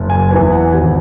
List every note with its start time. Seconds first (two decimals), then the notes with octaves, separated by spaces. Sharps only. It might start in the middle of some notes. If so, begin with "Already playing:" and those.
Already playing: F#1
0.10 G#5
0.31 E2 E3 B3 G#5
0.52 F#5
0.72 G#1 G#5